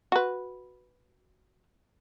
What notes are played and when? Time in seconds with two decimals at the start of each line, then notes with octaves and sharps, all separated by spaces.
0.12 F#4 B4